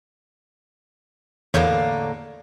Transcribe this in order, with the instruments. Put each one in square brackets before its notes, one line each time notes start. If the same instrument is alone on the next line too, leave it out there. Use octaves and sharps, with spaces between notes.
[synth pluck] E2 C#5 G6 [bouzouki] A2 D3 A#3